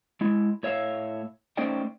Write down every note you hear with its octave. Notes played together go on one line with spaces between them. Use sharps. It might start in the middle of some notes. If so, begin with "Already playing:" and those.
G#3 E4
A2 C#5 E5 F5
A3 C#4 D#4 C5 D5 G5